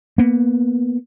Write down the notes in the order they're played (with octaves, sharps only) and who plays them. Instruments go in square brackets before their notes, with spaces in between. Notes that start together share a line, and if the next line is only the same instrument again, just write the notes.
[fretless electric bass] A#3 B3